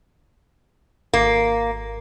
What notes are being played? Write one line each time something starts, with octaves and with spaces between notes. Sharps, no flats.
G#1 A#3